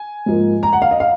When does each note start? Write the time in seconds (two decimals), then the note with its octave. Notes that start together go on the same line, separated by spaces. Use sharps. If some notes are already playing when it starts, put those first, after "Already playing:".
Already playing: G#5
0.26 G#2 F3 A#3
0.63 A#5
0.73 F#5
0.82 F5
0.91 D#5
1.00 F5